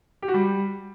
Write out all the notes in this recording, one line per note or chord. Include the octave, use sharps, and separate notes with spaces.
G4
F#4
G3